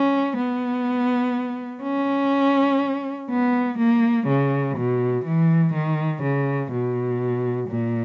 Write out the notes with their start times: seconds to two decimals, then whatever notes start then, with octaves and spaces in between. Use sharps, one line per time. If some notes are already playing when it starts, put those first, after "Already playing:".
Already playing: C#4
0.37 B3
1.83 C#4
3.30 B3
3.79 A#3
4.27 C#3
4.77 B2
5.25 E3
5.74 D#3
6.23 C#3
6.72 B2
7.69 A#2